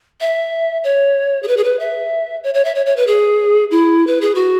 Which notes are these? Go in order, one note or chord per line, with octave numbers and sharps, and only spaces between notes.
E5
C#5
G#4
B4
G#4
B4
E5
C#5
C#5
E5
C#5
C#5
B4
G#4
E4
B4
G#4
F#4